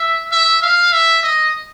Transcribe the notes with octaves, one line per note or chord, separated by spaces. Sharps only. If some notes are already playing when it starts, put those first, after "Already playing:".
Already playing: E5
E5
F5
E5
D#5